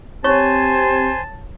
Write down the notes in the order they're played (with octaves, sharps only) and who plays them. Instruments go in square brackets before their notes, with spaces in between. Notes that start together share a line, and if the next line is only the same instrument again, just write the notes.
[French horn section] C4 G4 [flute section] C5 G#5 G#6 [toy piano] C#5 C#6 [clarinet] A5